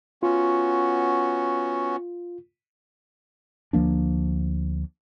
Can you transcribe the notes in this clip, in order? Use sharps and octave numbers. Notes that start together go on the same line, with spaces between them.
B3 C#4 F4 F#4
D2 F3 A#3 D4